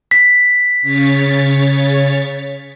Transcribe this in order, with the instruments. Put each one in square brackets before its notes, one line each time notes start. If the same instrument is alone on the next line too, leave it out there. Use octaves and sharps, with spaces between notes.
[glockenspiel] B6
[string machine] C#3 C#5 A6